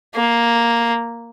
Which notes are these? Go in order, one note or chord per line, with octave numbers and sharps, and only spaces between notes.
A#3